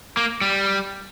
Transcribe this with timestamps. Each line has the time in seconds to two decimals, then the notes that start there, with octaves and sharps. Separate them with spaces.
0.17 A#3
0.42 G3